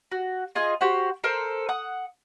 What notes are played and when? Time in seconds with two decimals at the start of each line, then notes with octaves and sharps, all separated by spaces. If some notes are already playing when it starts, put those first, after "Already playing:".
0.12 F#4
0.55 F4 G#4 D#5 G#5
0.81 F#4 G4 C5 F#5
1.24 A4 A#4 C5
1.69 F#5 D#6